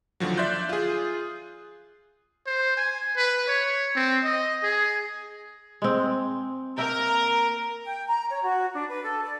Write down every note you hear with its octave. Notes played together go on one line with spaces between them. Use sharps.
D#2 D3 F3 F#3
D5 E5 C6 F#6 G6
F4 G#4
C5
G#5
B4
C#5
C4
D#5
G#4
G#3 C4
A#3 A#4 E5 G5
G5
A#5
C#5
F#4
D4
B4
A4
D5